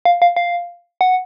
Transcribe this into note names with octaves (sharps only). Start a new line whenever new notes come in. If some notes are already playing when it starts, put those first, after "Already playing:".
F5
F5
F5
F#5